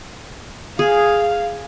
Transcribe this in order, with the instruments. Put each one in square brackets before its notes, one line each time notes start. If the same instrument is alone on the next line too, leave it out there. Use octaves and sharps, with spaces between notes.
[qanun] G#4 [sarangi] F5